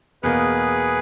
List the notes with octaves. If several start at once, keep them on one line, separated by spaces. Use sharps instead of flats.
E2 B2 A#3 G#4 B4